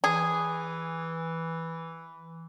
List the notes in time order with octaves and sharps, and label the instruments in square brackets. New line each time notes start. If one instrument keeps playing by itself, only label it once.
[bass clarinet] E3 [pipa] G#4